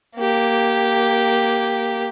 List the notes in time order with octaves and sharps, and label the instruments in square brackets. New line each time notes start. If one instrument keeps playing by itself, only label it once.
[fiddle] A#3 G4